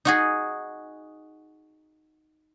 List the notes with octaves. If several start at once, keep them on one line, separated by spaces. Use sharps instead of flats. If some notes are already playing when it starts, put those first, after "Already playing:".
D#4 F#4 G#4